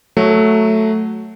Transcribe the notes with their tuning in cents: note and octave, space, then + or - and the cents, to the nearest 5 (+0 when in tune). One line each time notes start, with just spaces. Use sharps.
F#3 +0 A3 +0